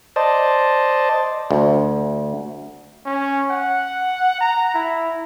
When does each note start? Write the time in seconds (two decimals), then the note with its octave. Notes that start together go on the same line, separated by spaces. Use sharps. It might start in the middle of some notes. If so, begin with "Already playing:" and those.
0.16 C5 D5 D#5 A5
1.51 D2
3.05 C#4
3.50 F#5
4.41 A#5
4.74 E4